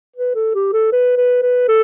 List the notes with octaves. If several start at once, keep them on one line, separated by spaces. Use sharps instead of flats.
B4
A4
G4
A4
B4
B4
B4
A4